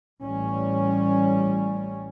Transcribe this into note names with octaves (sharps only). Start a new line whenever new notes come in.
A1 G3 C#4